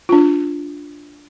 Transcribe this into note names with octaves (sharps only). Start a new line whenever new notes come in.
D4 F4